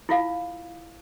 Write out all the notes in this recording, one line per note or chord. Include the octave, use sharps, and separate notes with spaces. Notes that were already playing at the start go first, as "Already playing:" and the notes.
E4 F4 F5